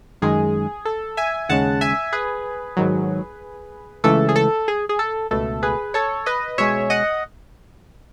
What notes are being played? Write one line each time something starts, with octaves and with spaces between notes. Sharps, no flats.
F#2 D#3 G#3 G#4
A4
E5 G#5
D#2 C#3 G#3 C#4 F#5 A5
E5 G#5
G#4 B4
G#2 D#3 F#3
C#2 C#3 E3 A3 A4
G#4
A4
G#4
G#4
A4
C#2 B2 A3 A4
G#4 B4
A4 C#5
B4 D#5
B2 G#3 C#4 C#5 E5
D#5 F#5